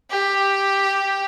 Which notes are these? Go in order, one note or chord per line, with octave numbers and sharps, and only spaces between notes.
G4